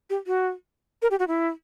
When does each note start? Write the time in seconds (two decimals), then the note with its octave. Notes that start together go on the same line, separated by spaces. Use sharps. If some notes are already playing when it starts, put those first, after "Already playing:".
0.10 G4
0.27 F#4
1.02 A#4
1.11 G4
1.19 F#4
1.28 E4